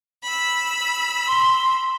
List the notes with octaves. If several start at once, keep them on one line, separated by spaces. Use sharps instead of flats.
B5 E6
C6